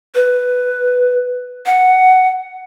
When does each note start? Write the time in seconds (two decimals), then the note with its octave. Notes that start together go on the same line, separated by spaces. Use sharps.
0.15 B4
1.66 F#5